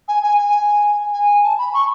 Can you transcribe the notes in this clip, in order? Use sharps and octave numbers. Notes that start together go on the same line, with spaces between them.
G#5
G#5
G#5
G#5
A5
B5
C#6